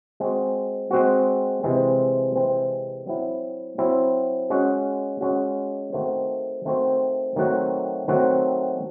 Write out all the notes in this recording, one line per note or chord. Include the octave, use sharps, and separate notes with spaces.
G#3 C4 F#4
G#3 C4 F#4
C3 E3 G#3 C4
C3 E3 G#3 C4
F#3 C4 E4
F#3 C4 E4
G#3 C#4 F#4
G#3 C#4 F#4
D#3 A3 C4 F#4 C5
D#3 A3 C4 F#4 C5
D#3 F#3 A3 C4 F#4
D#3 F#3 A3 C4 F#4